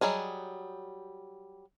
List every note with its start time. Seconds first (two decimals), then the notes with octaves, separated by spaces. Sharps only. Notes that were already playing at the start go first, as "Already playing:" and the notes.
0.01 F#3 G3 G#4 D#5